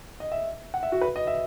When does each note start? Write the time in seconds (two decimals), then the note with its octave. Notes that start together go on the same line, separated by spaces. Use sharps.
0.20 D#5
0.32 E5
0.74 F#5
0.83 E5
0.92 F#4
1.01 B4
1.16 D#5
1.27 E5